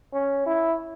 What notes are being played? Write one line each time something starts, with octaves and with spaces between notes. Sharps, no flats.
C#4
E4